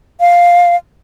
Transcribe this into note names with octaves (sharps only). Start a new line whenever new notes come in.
F5